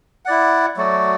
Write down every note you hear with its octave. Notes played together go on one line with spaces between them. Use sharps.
E4 D5 F#5
F#3 A3 F#4 D5